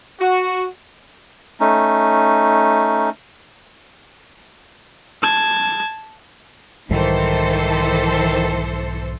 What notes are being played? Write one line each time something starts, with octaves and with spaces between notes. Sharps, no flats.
F#4
A3 C#4 D#4
A5 G#6
B1 G#2 D#3 E3 G3 A4 C5